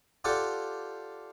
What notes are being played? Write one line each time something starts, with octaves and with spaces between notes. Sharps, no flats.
F4 G4 A4 D5 F#5